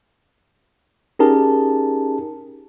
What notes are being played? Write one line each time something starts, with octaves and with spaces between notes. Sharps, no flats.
C#4 D#4 G4 G#4 A#4 A5